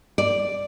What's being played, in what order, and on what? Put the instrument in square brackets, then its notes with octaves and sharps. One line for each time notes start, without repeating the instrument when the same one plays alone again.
[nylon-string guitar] D5